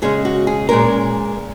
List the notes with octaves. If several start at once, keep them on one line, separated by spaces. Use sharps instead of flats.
C#3 G#3 C#4 G#4
F#4
G#4
A#2 G#3 C#4 A#4